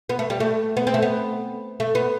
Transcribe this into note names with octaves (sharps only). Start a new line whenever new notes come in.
B3
A3
G3
A3
B3
C4
A3
B3
A3
B3